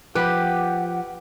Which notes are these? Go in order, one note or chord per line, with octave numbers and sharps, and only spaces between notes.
F3 G4 B4 F#5